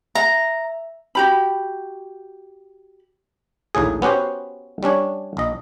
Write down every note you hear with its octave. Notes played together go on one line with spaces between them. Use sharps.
E5 A#5
F#4 G4 B5
A#1 D#2 A2 G#4
B3 C#4 F#4 G4 C5
G3 C#4 D4 C#5
A#1 D#5